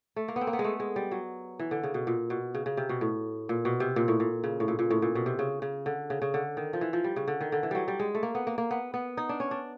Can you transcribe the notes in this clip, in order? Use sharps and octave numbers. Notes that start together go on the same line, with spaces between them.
A3
A#3
B3
C4
A#3
B3
G#3
A3
G#3
G3
F#3
E3
D3
C#3
B2
A#2
B2
C#3
C#3
C3
B2
A2
A#2
B2
C3
A#2
A2
A#2
C#3
A2
A#2
A#2
A2
A#2
B2
C3
C#3
C#3
D3
C#3
C#3
D3
D#3
F3
E3
F3
G3
C#3
D3
D#3
D3
E3
F#3 G3
G3
G#3
A3
A#3
B3
A#3
A#3
B3
B3
D#4
D4
C#4
D4